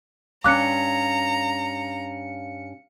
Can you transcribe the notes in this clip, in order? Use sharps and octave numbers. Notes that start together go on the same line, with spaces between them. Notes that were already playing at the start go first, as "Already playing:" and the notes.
G2 C#4 F5 A#5 D6 F#6 C#7